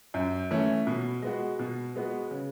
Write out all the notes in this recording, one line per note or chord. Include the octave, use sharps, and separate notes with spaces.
F#2
E3 A3 C#4
B2
G#3 B3 F#4
B2
G#3 B3 F#4
C#3